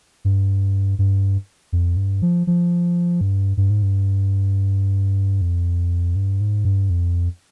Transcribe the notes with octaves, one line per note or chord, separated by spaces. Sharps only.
G2
G2
F2
G2
F3
F3
G2
G2
G#2
G2
F2
G2
G#2
G2
F2